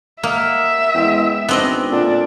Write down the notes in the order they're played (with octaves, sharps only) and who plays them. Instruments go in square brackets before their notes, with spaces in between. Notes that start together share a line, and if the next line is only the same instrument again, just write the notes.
[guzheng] A#3 [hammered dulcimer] D#5 F#5 [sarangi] E5
[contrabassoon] E2 [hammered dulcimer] G#3 C#4 G5
[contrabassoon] G#1 [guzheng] B3 C4 D#5 [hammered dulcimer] D4 E5
[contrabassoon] A#2 [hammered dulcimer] D3 E5 [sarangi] D4